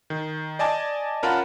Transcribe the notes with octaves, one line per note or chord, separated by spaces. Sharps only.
D#3
D5 D#5 G#5 A5 D6
C#4 F4 A#4 F#5 A5 B5